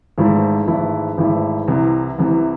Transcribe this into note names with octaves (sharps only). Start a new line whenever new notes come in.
G#1 G#2 E3 A3 E4
G#1 G#2 E3 A3 E4
G#1 G#2 E3 A3 E4
C2 C3 E3
C2 C3 E3